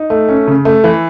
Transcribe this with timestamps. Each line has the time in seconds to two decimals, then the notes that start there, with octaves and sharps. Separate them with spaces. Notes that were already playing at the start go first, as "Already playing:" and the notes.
Already playing: D#4
0.10 A3
0.29 C#4
0.47 C#3
0.65 A3
0.84 E3